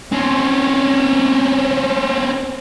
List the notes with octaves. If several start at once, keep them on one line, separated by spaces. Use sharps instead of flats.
C4 C#4